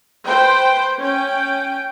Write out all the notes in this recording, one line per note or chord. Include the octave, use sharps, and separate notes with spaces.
B4 C5 G5
C#4 G5